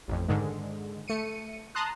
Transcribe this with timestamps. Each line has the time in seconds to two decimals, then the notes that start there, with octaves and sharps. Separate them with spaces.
0.08 A1 F2
0.28 G#2 D3 D#3 G#3
1.08 A3 C#7 D#7
1.75 A5 A#5 C6 D#6 F#6